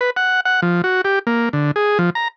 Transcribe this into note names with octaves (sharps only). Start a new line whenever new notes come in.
B4
F#5
F#5
F3
F#4
G4
A#3
D3
G#4
F3
A#5